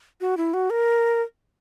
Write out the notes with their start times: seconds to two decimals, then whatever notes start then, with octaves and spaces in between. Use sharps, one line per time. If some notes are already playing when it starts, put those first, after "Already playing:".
0.21 F#4
0.37 E4
0.54 F#4
0.70 A#4